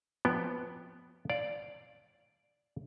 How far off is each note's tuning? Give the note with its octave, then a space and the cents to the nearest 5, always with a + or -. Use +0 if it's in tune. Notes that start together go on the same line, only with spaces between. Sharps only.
F3 +0 B3 +0 G5 +0
D5 +0 F5 +0